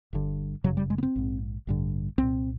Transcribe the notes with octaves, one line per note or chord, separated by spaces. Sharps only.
G1 G2 D3
G1 F#2 C#3 F#3
G3
G#3
B3
C4
A#1 G#2
A1 G2 D3
C2 A#2 C4